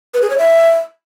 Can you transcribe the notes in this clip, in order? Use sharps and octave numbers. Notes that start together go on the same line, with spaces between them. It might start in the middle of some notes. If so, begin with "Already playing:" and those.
B4
G#4
C#5
E5